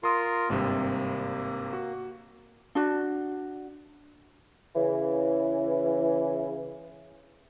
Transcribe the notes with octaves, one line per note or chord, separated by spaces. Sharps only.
F4 A#4 C6 D#6
G#1 G2 C3 A#3
F#4
D4 F#4
C#3 E3